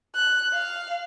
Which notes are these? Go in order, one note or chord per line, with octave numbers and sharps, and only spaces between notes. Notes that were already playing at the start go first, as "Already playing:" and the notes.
F#6
F5